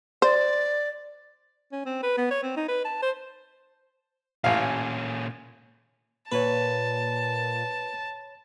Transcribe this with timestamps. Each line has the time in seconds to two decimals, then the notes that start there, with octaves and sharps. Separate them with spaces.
0.22 C5 D5
1.72 C#4
1.86 C4
2.03 B4
2.17 B3
2.31 C#5
2.43 C4
2.56 D#4
2.68 B4
2.85 A5
3.03 C5
4.44 A1 A#2 C#4 F5
6.32 A#2 B4 C#5 A5 B5